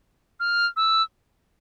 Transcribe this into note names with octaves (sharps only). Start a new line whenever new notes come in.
F6
E6